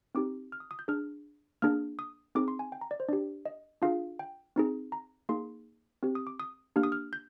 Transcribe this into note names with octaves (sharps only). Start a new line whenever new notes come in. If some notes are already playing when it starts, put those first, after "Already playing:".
C4 D#4 G4 D6
F6
D#6
D#6
G6
D4 G#4 F6
A#3 D4 G#4 F6
D#6
C4 D#4 G#4 D6
C6
G#5
G5
A#5
D5
C5
D4 G4 D5
D#5
D4 F4 G#4 F5
G5
C4 D#4 G#4
A#5
A#3 D#4 G#4 C6
C4 G4
D#6
D6
D#6
A#3 D4 G4 F6
D#6
F6
G6